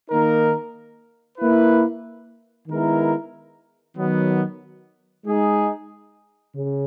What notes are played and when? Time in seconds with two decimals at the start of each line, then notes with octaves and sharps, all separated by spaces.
0.09 D#3 A#3 D#4 A#4
1.38 A#3 E4 B4
2.68 D#3 G#3 B3 E4 A#4
3.96 D#3 F#3 B3
5.25 G#3 D#4 G#4
6.55 C#3